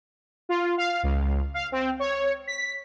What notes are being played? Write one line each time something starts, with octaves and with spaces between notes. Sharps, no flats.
F4
F5
C#2
F5
C4
C#5
B6